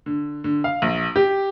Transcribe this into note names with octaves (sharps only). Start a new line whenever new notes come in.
D3
D3
F5
A#1
G4